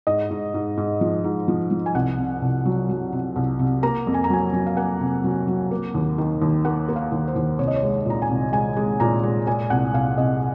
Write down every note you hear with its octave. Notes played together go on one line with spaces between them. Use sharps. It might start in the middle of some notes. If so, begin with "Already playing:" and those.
G#2 D#5
G#2
G#2
G#2
F3
G#2
F3
F3
G#5
C2 F#5
C3
C2
F#3
F#3
C3
C2
C3
A#3 A#5
F2
G#5
A#5
F#3 G#5
F#3
F5
A#3 F#5
C3
F#3
F#3
A#3
D#2
D#3
D#2
A#3 F#5
A#3
F5
D#2
C5
D#2
C2 C#5
D#5
C#5
G#3
A#2 A#5
G#5
C2
G#3 G#5
G#3
A#2 A#5
G#3
A#2 G#5
C2 F#5
C2 F5
C2 D#5